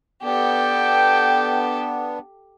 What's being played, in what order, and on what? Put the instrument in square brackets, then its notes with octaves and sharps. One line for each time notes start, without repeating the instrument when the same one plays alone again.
[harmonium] B3 D4 [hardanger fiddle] G4 A4 [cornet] G5